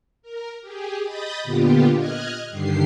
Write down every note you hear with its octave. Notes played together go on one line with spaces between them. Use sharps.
A#4
G4 G#4
D#5 B5 D#6 G6 A6
A#2 D3 B3 F4 G4
D#5 F6 F#6 G#6
G2 D3 D#3 G4 C7